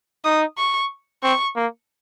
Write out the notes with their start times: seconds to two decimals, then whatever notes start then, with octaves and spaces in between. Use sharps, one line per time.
0.25 D#4 D#6
0.58 C#6
1.23 C4 C#6
1.56 A#3